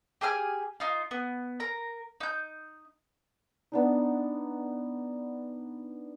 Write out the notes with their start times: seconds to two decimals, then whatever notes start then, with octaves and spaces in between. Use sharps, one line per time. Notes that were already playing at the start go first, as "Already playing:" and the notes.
0.21 G4 G#4 G#5 F6
0.80 D#4 F4
1.11 B3
1.60 A#4 A#5
2.20 D#4 G6
3.72 B3 D4 D#4